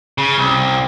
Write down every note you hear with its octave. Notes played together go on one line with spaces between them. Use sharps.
C#3
C2